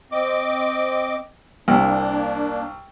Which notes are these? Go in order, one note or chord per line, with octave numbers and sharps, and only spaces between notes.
C4 D#5 D6
C2 A#3 D4